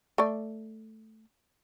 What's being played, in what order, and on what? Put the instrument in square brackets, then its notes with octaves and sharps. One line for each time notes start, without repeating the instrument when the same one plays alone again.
[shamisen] A3 D5